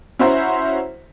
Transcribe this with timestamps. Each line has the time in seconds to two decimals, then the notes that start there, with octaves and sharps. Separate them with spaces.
0.19 C#4 E4 F#4 C5 E5 A#5